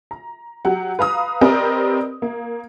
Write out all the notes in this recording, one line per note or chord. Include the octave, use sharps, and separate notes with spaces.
A#5
F#3 G4 F#5
B4 F5 A#5 D#6
C4 G4 A#4 B4 D5 D#5
A#3